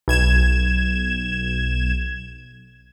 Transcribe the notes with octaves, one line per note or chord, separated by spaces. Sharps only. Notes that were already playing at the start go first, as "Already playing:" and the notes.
B1 G#6 E7